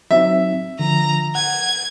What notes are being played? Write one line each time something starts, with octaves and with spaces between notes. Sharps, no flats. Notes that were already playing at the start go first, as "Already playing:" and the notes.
F#3 C4 D#4 E5
D3 F3 A#5
F#5 G#6